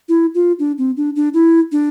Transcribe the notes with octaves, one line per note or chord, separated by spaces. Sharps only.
E4
F4
D4
C4
D4
D4
E4
D4